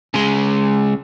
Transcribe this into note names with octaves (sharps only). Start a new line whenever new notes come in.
C#3 G#3